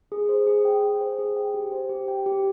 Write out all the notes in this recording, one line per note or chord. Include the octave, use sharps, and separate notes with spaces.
G#4
C5
G#4
G5
G#4
C5
G#4
G5
G4
C5
G4
G5
G4